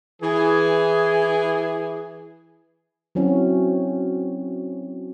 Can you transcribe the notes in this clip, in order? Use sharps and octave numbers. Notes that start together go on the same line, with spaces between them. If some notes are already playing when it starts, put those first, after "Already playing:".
E3 G#4
F#3 C4 C#4 E4 F#4